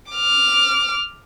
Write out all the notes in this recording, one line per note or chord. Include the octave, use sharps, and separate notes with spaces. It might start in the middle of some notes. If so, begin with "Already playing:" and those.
D6 F6